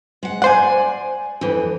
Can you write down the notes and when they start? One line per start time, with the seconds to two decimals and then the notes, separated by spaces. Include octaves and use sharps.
0.23 G#3 F#5
0.42 C5 D5 F#5 G#5
1.41 F2 E3